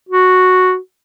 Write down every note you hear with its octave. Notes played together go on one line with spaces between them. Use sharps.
F#4